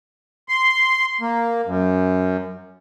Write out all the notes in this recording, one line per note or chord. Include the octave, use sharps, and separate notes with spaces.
C6
A#3
F#2